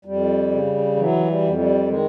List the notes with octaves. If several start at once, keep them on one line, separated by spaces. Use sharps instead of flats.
F2 G3
C#3
E3 F#3
G3
F2
G3
D#3 G#3